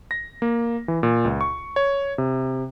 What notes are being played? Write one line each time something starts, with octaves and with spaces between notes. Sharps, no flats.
A#6
A#3
E3
A#2
C#2
C#6
C#5
C3